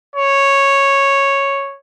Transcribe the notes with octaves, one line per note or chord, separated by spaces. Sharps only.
C#5